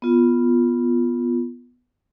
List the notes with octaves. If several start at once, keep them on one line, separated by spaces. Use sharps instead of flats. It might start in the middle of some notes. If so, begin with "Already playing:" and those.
B3 F4